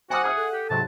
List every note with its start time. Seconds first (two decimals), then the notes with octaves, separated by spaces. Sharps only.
0.10 F#4 C5 F#5 G#5 D6 D#6
0.24 G#4 E5 D#6 F#6
0.36 A4
0.53 G4
0.70 G#2 C3 F#3 A5